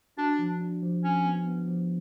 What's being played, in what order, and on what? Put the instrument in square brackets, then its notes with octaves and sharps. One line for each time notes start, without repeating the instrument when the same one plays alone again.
[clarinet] D4 [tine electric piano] F#4
[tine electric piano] F3
D4
F3
[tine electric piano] F3 [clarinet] C#4
[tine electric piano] B3
B3
F3